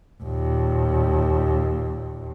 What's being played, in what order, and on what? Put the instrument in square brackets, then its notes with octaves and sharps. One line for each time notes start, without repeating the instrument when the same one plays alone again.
[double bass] D#2 A#2